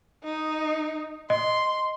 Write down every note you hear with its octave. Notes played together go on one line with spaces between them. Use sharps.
D#4
D#5 C6